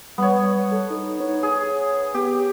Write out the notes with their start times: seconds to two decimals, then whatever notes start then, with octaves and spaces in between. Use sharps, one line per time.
0.18 G3 B3 C#5
0.72 A4
0.90 D#4
1.20 C#5
1.43 G#4
2.14 B3 G4